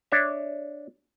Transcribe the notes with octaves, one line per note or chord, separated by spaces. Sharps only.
D4 C#5 E5